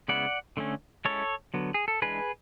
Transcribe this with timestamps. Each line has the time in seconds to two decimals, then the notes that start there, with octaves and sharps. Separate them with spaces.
0.08 C#3 G#3 B3 E4 D5 F#5
0.57 D3 A3 C#4
1.05 G#3 C#4 E4 A4 C#5
1.54 D3 F#3 B3
1.74 G#4
1.88 A4
2.02 E3 G#3 D4 G#4 B4